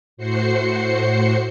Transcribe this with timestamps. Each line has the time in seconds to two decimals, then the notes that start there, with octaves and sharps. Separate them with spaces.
0.17 A2 F#4 C5 C7 C#7